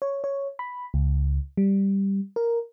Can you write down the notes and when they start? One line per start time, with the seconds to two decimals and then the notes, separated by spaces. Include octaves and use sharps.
0.02 C#5
0.24 C#5
0.59 B5
0.94 C#2
1.57 G3
2.36 A#4